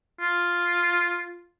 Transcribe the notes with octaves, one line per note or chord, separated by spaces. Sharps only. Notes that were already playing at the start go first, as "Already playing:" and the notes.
F4